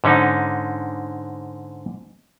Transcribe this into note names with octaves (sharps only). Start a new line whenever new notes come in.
G#2 D3 C#4 D#4